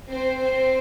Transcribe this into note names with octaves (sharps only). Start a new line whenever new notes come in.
C4 C5
C4 C5